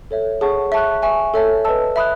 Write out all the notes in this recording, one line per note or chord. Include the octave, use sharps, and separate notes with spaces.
A4 C#5 E5
G#4 C#5 F#5 A5 C#6
E5 A5 C#6 F#6
E5 G#5 C#6
A4 C#5 E5 A5
B4 D#5 A5 E6
E5 B5 D#6 F#6